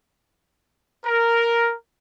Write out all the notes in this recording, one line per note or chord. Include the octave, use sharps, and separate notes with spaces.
A#4